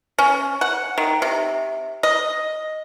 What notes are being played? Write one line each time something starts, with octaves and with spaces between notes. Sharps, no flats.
C#4
F#5
D#3
C3
D#5